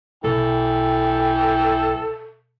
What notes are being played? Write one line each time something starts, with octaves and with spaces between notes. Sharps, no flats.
B1 E3 A4 G5